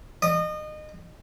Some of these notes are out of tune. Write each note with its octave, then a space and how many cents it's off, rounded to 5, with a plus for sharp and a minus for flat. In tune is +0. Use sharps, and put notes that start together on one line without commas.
D#5 -30